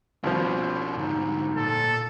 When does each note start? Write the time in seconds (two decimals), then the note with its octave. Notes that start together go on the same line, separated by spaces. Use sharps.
0.24 C2 B2 F3 C#4 D4
0.96 G#2 D3 D#4
1.56 A#2 A4